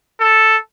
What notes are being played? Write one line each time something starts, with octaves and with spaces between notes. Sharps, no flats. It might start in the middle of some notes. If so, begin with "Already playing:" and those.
A4